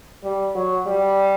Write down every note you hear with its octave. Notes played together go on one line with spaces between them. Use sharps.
G3
F#3
G3